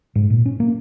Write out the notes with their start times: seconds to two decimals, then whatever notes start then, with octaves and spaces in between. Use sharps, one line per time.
0.15 G#2
0.30 A#2
0.46 C#4
0.60 A#3